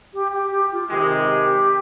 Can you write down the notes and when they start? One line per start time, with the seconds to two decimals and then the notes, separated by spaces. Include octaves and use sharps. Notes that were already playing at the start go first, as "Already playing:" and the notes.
0.11 G4
0.32 G4
0.51 G4
0.70 F4
0.89 C3 D#3 G#3 G4